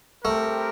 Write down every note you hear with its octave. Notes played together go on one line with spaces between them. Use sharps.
A3 C4 G4 A#4